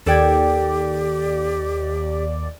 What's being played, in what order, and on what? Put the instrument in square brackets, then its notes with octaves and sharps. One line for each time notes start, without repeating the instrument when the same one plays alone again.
[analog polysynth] D#2 D5 [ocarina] G4 [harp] A4 G5 G#6